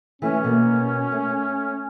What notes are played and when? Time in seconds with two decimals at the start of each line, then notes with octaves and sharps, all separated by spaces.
0.22 E3 A3 C#4
0.44 B2 A#3
1.12 A3